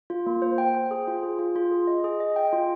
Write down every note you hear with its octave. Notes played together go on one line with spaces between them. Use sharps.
F4
A#3
C5
G5
G5
G#4
F4
G#4
F4
F4
G#4
D#5
G#4
D#5
G5
F4